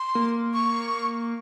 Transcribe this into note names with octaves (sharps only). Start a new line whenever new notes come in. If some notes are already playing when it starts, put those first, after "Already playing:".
Already playing: C6
A#3
C#6